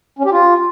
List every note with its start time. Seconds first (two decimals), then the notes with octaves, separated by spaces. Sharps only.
0.19 C#4
0.25 G4
0.32 F4